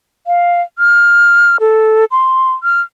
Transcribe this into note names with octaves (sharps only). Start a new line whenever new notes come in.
F5
F6
A4
C6
F6